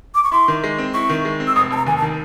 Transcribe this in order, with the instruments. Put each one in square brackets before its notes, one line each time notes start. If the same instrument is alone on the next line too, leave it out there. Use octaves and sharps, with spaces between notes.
[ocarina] D6
C#6
[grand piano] E4 [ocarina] C6
[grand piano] D#3
G#3
C4
[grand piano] E4 [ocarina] C#6
[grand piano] D#3
G#3
C4
[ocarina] E6
[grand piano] F1 [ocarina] D#6
[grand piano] F1 [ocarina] A5
[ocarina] A#5
[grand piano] D#2 [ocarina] G#5
[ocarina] A5
[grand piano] D#3